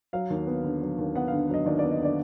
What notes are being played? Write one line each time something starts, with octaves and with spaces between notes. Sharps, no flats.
F#3 F5
D#2
B3
D3
F#3
D#2
B3 F#5
F5
D3
F#3 D#5
D#2 D5
D5
B3
D#5
D3 D5